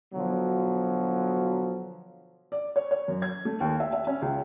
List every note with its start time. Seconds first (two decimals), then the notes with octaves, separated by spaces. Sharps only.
0.13 B2 D3 F3 F#3
2.52 D5
2.76 C#5
2.91 C#5
3.08 F#2
3.22 G#6
3.45 A3
3.60 D#2
3.80 E5
3.93 E5
4.07 C#4
4.22 C#2